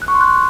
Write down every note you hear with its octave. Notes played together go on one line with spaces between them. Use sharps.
F#6
C#6
C6
F#6